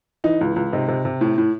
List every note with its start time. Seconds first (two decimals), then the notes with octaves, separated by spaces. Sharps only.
0.24 E3 D#4
0.41 C#2
0.56 C#2
0.73 C3 D#4
0.88 C3
1.05 C3
1.21 A2
1.38 A2